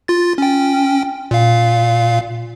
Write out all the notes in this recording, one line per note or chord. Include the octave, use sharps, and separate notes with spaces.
F4 A6
C#4 G5
A#2 F5